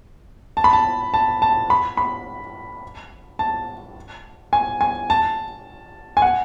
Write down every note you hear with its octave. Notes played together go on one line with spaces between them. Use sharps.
A5
B5
A5
A5
A5
B5
B5
A5
G#5
G#5
A5
G#5
F#5